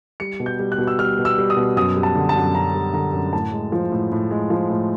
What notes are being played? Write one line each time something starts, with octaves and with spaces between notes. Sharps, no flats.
G3 C#7
B2
G6
G3
F#6
B2
E6
G3 F6
B2
E6
G3
D#6
B2
F#2 D#6
G3
A5
D3
A5
F#2
F#2 A#5
G3
D3 A#5
F#2
A2 A5
G#3
F3
A2
A2
G#3
F3
A2